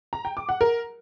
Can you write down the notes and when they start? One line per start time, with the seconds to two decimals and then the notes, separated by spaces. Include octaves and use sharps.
0.13 A#5
0.25 G5
0.37 D6
0.49 F#5
0.61 A#4